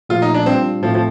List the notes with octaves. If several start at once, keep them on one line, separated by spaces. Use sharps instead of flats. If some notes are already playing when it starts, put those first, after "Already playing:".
A#2 F3 A3 F4
D#4
D4
G3 C4 D4 F4
A2 F3 A3 C4
F3